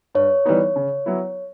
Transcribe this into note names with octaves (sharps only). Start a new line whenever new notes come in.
G2 C#5
E3 G3 B3 D#4
C#3
F#3 B3 E4